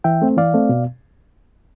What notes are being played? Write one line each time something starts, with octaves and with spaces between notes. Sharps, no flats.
E3 E5 G5
A3 C4
E3 D5 F5
A3 C4
B2